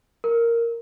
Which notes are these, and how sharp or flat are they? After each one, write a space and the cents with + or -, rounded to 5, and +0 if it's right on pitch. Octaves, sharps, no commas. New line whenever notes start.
A#4 -5